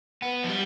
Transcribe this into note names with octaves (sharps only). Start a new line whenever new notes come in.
B3
F3
G3